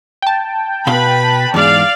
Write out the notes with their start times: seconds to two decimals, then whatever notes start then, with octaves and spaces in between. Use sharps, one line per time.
0.22 G5 A5
0.87 B2 B4 F5 B5 C6
1.54 E2 G#2 D5 F5